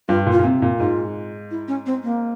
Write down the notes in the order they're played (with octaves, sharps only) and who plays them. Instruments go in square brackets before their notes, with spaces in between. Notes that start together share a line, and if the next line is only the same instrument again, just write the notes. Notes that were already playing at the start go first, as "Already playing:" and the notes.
[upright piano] G2 [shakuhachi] F4
[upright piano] A#2
[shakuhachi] F4
[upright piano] A#2
C3
A#2
[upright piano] G#2 [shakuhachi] F4
[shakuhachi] E4
C#4
C4
A#3